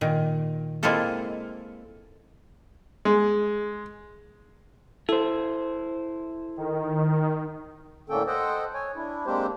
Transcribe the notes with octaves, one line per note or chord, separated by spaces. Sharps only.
A#2 D#3
G#3 A#3 C4 E4 F4 A4
G#3
E4 A4 C5
D#3
A2 D3 A#3 C#4 A4 G5
A4 C5 D#5 F#5 G5
C#5 G#5
D4 E4
G#3 A#3 C4 D4 G4 C5